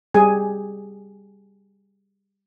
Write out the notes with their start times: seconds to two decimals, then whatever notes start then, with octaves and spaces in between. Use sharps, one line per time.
0.14 G3 G4 G#4 G#5